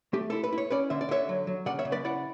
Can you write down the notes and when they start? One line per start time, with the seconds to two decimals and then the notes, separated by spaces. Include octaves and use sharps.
0.13 A3 G4
0.30 E4 A4
0.44 B4
0.53 E4
0.58 C#5
0.70 C#4 B4 D5
0.90 D3 E5
1.01 D5
1.09 D3 C#5 E5
1.29 F#3
1.47 F#3
1.66 C#3 D5 F#5
1.79 C#5 E5
1.85 C#3
1.92 B4 D5
2.04 E4 D5 F#5